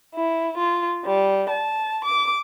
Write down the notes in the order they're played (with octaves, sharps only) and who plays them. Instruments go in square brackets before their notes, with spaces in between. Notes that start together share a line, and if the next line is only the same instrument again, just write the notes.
[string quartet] E4
F4
G3
A5
D6